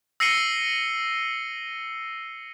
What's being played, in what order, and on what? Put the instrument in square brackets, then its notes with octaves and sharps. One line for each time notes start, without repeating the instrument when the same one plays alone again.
[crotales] E6 A#6 C7 C#7 D#7 G7